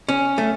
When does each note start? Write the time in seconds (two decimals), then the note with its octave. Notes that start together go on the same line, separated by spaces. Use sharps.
0.09 C#4
0.38 A3